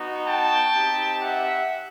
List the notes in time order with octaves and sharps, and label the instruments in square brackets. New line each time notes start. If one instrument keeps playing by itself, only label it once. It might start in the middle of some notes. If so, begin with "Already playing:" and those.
Already playing: [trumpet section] B3 D#4 F#4
G5 A5
C4 D#4 G4
E5 F#5